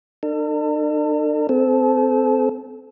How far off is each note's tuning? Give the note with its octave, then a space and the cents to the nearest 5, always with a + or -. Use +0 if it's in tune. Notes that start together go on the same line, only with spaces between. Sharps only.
D4 +45 A4 +45
C4 -20 A4 -25